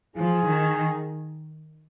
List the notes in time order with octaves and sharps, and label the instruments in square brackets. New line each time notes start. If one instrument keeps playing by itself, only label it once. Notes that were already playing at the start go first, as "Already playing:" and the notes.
[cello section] F3 [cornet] G#4
[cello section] D#3